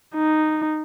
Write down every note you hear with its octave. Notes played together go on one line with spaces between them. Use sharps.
D#4